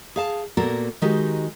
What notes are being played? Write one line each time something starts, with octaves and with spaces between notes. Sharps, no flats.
G#4 F5 A5
A#2 A#3 B3 F#4 A4 A#4
D#3 G#3 D#4 F#4 G4